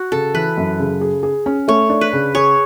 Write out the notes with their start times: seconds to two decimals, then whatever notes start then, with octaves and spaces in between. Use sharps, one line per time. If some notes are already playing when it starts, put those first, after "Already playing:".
Already playing: F#4
0.12 C#3 A4
0.34 E3 B4
0.57 F#2
0.79 C#3
1.01 G#4
1.23 G#4
1.46 C#4
1.68 A3 C#5
1.90 D4
2.01 B4
2.13 C#3
2.35 G#4 C#5